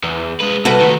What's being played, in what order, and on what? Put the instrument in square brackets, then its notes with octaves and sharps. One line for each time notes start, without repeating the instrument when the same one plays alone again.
[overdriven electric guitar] E2
G#3 B4
[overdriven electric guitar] C2 [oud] F#4 A4 B4
[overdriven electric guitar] D#3 A3